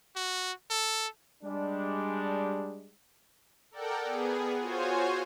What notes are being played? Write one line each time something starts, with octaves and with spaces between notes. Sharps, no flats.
F#4
A4
G3 G#3 D4
A4 A#4 D5 F#5 G5
B3 G#4
F4 F#4 C5 C#5 G#5